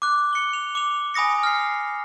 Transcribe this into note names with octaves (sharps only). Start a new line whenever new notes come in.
D6 F#6
C#7 G7
F7
D6 F7
G#5 B5 D#6 A#6 C#7
F6 C7